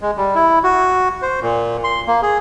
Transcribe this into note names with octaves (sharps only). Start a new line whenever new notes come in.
G#3
G3
E4
F#4
C5
A#2
C6
A#3
G#4